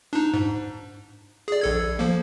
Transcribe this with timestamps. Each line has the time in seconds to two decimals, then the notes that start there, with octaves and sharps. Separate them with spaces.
0.13 D4 D#4
0.34 G#2
1.48 G#4 D5
1.61 A#1 A4 G#6
1.99 F3 A#3